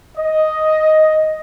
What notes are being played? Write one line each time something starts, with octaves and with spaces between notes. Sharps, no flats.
D#5